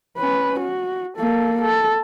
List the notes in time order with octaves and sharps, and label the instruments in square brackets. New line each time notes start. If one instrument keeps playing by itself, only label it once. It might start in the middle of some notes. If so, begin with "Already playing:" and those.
[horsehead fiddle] C#4 B4
F#4
A#3 A4
A4